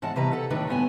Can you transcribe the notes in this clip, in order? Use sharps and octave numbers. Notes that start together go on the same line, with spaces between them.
G#2 E3 G#3 F#5 A5
C3 E3 G3 B4 D#5 A#5
A4 F#5
D2 A2 D#3 F#3 D4 B4
D2 G2 B3 G#5